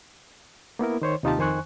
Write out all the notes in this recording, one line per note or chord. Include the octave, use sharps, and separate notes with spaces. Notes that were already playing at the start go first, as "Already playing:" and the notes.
A#3 B3 E4 A#4
D#3 C5 C#5
D#2 C3 D#4 F4 G4 A5
F2 D#3 C5 G#5 C#6 F#6